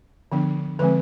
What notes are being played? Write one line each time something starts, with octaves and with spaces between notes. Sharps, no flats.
D3 F3 B3 D4
D3 F3 G#3 C4 B4